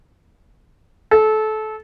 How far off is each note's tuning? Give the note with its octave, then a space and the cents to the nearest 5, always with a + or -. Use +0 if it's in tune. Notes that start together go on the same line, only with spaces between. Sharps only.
A4 -25